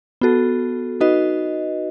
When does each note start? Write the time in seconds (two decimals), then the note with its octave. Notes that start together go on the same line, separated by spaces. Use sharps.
0.21 B3 F#4 A4
1.00 D#4 F#4 B4 D#5